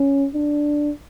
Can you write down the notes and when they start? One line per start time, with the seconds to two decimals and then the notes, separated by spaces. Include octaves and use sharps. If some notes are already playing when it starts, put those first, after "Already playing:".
Already playing: C#4
0.34 D4